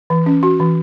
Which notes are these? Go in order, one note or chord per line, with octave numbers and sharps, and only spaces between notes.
E3
C#4
F#4
E3